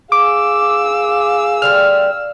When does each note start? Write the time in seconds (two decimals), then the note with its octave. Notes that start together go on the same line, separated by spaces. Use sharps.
0.12 G#4 F5 D6 E6
1.62 D3 G3 C4 F6